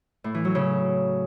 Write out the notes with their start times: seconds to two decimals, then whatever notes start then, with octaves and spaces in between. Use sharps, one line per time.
0.24 A2
0.34 E3
0.45 F#3
0.55 C#3